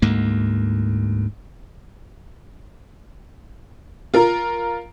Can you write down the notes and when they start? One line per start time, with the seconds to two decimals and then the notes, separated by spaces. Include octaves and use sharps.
0.02 D2 G#2 A#3
4.14 F4 A#4